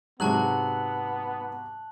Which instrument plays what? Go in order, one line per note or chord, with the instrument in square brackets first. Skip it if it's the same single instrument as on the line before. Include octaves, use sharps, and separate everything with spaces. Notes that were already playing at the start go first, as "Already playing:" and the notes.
[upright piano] G#2 [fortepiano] C3 F#3 [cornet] B3 [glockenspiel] A5 F#6 F#7